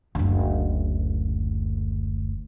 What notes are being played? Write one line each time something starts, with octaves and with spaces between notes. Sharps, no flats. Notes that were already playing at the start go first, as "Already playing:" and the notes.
F#1 D2